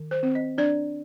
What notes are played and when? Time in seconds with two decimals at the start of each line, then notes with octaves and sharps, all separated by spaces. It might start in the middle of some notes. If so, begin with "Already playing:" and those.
Already playing: D#3
0.11 C5
0.23 C4
0.35 D#5
0.58 D4 D5